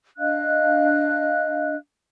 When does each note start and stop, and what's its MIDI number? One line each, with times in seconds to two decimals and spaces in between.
0.18 1.75 62
0.18 1.75 75
0.18 1.75 77
0.18 1.75 90